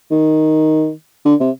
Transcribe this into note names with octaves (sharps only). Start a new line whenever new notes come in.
D#3
D3
C3